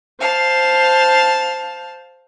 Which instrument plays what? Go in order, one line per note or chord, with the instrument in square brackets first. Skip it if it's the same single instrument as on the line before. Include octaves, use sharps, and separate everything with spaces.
[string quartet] C5 F5 A5